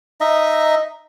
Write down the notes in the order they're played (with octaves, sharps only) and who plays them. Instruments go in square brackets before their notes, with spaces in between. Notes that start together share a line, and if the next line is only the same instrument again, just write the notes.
[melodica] D#4 D#5 E5